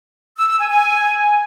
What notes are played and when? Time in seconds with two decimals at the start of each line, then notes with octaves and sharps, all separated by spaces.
0.37 E6
0.48 E6
0.59 G#5
0.70 G#5